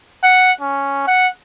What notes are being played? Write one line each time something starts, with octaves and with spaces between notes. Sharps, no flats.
F#5
C#4
F#5